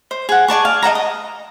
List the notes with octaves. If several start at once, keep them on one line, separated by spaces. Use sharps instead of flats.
C5
G#4 F#5
G#4 D5 A5 C#6
F5
D#5 F#5 A5 A#5
D#6